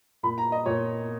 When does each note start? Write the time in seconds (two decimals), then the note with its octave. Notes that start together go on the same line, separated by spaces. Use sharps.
0.23 A#2 B5
0.38 A#5
0.52 D#5
0.66 A#2 C#5